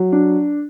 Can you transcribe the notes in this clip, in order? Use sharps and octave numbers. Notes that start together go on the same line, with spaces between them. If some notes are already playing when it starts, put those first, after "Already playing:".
Already playing: F#3
D4